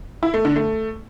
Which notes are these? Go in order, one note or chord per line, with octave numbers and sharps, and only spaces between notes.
E4
A3
D3
A3